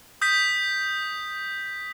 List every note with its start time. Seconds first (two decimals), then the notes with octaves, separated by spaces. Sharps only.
0.21 D#6 G6 B6